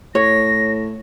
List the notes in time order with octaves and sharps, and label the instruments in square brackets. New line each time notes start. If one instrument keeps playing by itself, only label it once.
[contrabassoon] A2 [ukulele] C#5 [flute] A#6